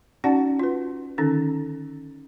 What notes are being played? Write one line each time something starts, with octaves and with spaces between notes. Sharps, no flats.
C#4 D#4 F#4 D5 F#5 A5
F4 B4
D3 D#3 C#4 D#4 A4